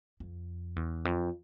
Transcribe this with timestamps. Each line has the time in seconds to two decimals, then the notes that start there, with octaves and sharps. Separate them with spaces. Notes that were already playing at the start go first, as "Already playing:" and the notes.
0.20 F2
0.76 E2
1.05 F2